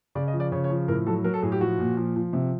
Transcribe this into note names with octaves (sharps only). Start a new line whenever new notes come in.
C#3 D5
D#5
F3
D5
C#3 C#5
C#5
F3
A2 A#4
F#3 A4
F#3 A#4
A4
A2 G#4
G4
F3 F#4
A#2
F3
F3
C3